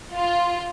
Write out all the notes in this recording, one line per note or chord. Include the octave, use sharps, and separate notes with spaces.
F4